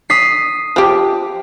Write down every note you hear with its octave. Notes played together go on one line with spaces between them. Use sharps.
D#6 B6 C7
F3 G4